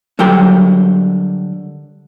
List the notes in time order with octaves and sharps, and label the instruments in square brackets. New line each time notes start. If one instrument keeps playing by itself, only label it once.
[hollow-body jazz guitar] D3 F#3 G3 A#4 G5